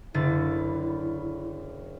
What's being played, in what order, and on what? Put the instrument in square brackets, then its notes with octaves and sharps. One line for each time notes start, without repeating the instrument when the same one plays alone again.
[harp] F#1 D3 A6 [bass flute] E4